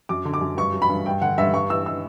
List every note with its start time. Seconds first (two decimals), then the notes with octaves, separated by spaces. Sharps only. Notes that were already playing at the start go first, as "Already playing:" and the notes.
0.09 F#2 D6
0.25 D3
0.34 D6
0.41 F#2
0.57 G2 C#6
0.73 F#3
0.82 B5
0.90 G2
1.06 G2 G5
1.22 D3 F#5
1.38 G2 E5
1.54 G2 C#6
1.70 E3 E6
1.86 E6